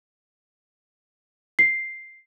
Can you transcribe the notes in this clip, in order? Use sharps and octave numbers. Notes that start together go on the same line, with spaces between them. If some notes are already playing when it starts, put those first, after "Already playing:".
C7